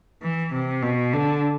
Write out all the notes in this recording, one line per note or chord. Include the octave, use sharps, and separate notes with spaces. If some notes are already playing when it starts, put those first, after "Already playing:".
E3
C3
B2
D3